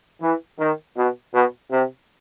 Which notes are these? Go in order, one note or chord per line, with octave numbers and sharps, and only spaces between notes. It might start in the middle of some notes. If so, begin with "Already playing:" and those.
E3
D#3
B2
B2
C3